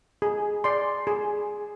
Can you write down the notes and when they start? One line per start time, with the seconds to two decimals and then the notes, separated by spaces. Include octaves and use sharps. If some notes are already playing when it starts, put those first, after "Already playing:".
0.22 G#4
0.64 D5 G#5 C6
1.07 G#4